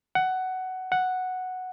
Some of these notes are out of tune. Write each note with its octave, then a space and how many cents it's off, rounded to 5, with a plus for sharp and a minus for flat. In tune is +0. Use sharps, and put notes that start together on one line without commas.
F#5 +15
F#5 +0